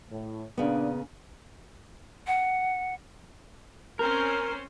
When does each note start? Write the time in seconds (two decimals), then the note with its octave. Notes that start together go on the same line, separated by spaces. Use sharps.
0.10 A2
0.58 A#2 C#3 B3 D4
2.27 F#5
3.99 C4 C#4 A#4 C5